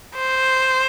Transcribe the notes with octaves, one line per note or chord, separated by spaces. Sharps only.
C5